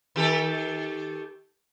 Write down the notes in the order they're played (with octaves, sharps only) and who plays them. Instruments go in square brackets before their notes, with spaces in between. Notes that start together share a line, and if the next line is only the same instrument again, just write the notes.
[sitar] D#3 G4 A4